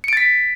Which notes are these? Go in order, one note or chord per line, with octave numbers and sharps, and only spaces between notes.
A6 B6 C#7 D7